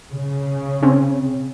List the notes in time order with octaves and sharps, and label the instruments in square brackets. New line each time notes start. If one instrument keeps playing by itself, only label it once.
[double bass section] C#3
[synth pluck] C4 C#4